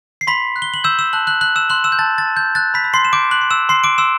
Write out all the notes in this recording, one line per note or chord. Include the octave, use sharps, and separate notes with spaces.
C7
B5 C6 B6
F#6
G7
F#7
E6 G6 E7
E6 E7
A5 F#6 F#7
F#6 F#7
F#6 F#7
E6 E7
C6 F#6 F#7
E6 E7
G6
A5 A6
A6
A5
G6
F#6 A6
B5 B6
B5
C6 C7
E7
D6 G6 D7
F#6 F#7
C6
E6 E7
C6 C7
D6 D7
C6 E6 E7